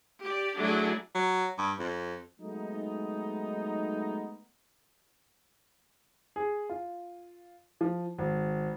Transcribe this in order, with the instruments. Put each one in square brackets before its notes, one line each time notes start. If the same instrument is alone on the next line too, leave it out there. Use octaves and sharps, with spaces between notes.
[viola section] G4 D5
F#3 A3 D4 E4 G#4
[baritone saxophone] F#3
G2
F2
[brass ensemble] F#3 G#3 A3 B3 D#4
[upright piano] G#4
F4
F3
G#1